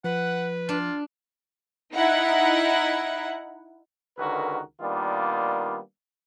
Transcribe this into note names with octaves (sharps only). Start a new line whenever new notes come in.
F3 B4 F#5
D4 F4
D#4 E4 F#5
C#2 D3 D#3 F#4 A#4 B4
D#3 G3 A#3 B3 D4 F4